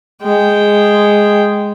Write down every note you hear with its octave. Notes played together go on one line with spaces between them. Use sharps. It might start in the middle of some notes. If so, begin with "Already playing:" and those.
G#3 G5